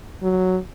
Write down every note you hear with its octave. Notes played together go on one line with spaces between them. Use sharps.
F#3